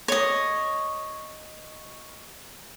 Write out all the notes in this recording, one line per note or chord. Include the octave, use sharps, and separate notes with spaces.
C#5 D#5